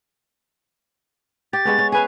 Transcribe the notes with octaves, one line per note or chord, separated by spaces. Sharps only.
G4 A6
G#3 B3 C#4
C#4
G#4 B4 F5 G#5